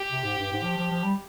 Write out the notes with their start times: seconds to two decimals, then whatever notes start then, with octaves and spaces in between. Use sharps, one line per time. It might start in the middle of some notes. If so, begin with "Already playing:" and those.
Already playing: G4
0.11 C3
0.24 G#2
0.38 G2
0.52 G#2
0.64 F3
0.77 F3
0.91 F3
1.04 G3